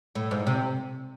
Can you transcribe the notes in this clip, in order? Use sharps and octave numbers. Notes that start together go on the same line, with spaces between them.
A2
G#2
C3